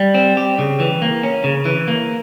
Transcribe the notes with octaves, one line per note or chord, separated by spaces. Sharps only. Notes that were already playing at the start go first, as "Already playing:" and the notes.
Already playing: G3
C4
G4
C#3
E3
A#3
C#4
C#3
E3
A#3